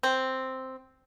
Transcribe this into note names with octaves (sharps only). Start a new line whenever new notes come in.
C4